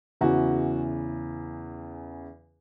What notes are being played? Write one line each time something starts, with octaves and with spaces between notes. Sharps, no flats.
E2 C#3 E3 F#4